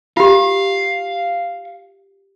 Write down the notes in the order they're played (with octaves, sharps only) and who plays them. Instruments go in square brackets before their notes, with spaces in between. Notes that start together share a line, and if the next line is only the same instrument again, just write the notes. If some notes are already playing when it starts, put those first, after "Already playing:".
[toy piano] F4 G4 [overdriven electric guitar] F5